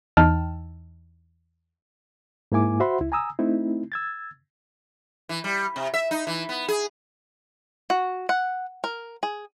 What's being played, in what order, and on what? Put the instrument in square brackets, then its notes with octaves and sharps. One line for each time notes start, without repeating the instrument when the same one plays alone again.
[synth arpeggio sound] E2 D#4 G5 A5 E6 F6
[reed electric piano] G#2 A#3 E4 G#5 D6
F#4 C5 E5 F#5 B5 C6
C#2 E4
G#5 A#5 D#6 E6
A3 C4 D#4 E4
E6 G#6 A6
[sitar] E3
G3
C3
E5
D#4
E3
B3
G#4
[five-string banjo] F#4
F#5
A#4
G#4